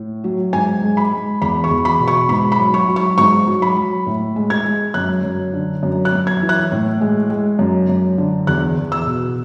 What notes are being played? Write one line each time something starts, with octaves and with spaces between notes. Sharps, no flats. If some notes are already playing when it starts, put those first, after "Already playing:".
Already playing: A2
F#3
G#2 G#5
G#3
B5
G#3
E2 B5
C#6
E2
B5
B2
C#6
G#2 B5
B5
F#3
C#6
F#3
C#6
G#2 C#6
F#3
B5
F#3
A2
G#3
G#6
G#3
F#2 F#6
F#2
D3
F#2
F#6
F#2
G#6
E3
F#6
A2
G#3
G#3
F#2
F#2
D3
E2 F#6
E2
E6
B2